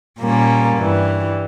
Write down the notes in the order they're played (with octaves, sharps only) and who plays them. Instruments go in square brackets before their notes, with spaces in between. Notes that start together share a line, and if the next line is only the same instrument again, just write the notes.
[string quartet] A#2 G3 A#3 C#4
G2 E3 G3